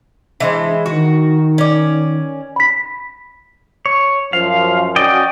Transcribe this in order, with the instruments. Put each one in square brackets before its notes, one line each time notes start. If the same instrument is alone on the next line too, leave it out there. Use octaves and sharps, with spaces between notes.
[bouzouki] E3 G#3 C5 [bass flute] D4
[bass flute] D#3 [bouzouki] F#4
[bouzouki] C#4 D5
[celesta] B5 B6
[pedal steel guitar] C#5
[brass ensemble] F#2 F3 [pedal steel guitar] F5
[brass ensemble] C#4 F#4 [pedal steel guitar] D5 D#5 G5